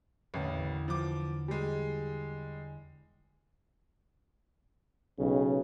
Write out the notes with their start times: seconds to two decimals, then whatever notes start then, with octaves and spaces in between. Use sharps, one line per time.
0.34 A1 E2 D3 A#3
0.88 F3 D6
1.48 G3 G#3
5.19 B1 C#3